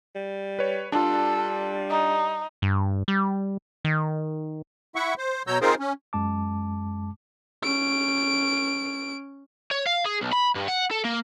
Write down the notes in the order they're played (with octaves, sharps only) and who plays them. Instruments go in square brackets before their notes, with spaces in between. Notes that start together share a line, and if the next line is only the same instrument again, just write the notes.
[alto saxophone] G3
[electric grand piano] B4 C#5
[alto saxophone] G3 [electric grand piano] D4 F4 [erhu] A4
[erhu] D#4
[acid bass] G2
G3
D#3
[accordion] E4 E5 F#5 C#6
C5
B2 F#3 C#5 A#5 E6 G6
C4 D#4 F4 G#4 A#4 C5
C#4
[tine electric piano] F#2 G#3 A5 D6
[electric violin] C#4 D7
[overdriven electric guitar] C#5
F5
G#4
B1
B5
G2
F#5
A4
A#3